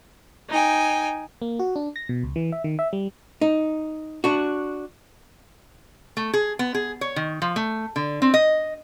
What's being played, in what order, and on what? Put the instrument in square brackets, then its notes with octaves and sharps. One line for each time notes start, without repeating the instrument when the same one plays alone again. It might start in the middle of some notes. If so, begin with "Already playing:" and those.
[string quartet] D#4 G5 G#5
[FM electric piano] A#3
F#4
D4
A#6
B2
C#2
E3
E5
D#3
E5
G3
[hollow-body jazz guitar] D#4
D4 F#4
[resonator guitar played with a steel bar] A3
G#4
B3
G#4
C#5
D#3
F3
A3
D3
C4
D#5